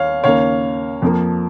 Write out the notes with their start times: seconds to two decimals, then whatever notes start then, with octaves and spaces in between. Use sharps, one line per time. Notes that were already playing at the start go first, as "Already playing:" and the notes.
Already playing: D#2 C#5 F5
0.24 D#2 C#3 A#3 C#5 F5
1.02 F2 F3 A#3